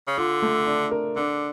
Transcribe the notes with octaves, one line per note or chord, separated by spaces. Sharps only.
C#3
D3 F4
A3
D4
A#4
D3 D4